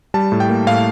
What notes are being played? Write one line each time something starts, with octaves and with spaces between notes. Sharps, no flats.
G3 A5
A2
G5
A#3
A2 F5